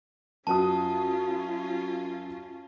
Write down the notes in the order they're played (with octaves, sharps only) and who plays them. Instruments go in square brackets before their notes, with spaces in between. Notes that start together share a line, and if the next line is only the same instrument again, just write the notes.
[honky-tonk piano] F#2 F#4 D#6 [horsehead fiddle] C#4 F4 [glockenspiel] A5